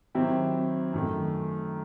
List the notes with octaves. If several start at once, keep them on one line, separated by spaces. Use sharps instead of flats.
D#3 F#3 C4 E4 G4
F#2 D#3 A3